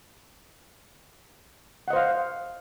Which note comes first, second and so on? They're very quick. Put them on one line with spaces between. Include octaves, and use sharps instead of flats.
F#5 D#5 C5 F5